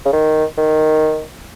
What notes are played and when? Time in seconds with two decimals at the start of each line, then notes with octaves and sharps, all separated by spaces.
0.05 C#3
0.13 D#3
0.58 D#3